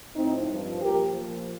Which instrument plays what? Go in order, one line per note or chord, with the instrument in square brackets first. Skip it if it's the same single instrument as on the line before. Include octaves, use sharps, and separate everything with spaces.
[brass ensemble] A2 F3 C4 D#4
G2 F3
A#2 F3 G4 A#4
A#2 F3